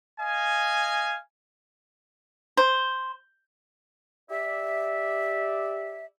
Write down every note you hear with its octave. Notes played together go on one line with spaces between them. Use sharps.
D#5 F5 G#5
C5
G4 D5 E5